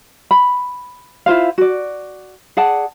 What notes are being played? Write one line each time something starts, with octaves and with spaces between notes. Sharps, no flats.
B5
E4 F4 C5 F5
F#4 D5
G#4 D5 F#5 A5